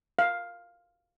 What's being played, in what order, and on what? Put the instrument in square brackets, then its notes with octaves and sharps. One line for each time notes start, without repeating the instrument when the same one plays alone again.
[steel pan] F5